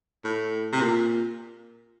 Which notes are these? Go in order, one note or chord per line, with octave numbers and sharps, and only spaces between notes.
A2
C3
A#2